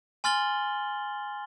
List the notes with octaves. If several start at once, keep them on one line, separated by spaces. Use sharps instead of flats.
G#5 C6 F6 A6 F#7 G7